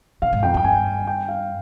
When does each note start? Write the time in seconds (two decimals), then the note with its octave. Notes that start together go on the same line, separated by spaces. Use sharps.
0.22 B2 F5
0.33 G#2
0.43 F2 G5
0.54 G2 G5
0.64 G#5
1.07 G5
1.28 F5